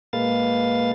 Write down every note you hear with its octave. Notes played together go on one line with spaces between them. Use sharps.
A#2 G#3 A#3 B4 F5 A6